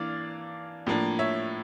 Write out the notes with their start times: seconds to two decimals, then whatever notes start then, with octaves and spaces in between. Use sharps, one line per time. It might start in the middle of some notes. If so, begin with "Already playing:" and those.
Already playing: E3 A#3 D4 D5 F5
0.87 A2 F3 A#3 D4
1.19 C#5 E5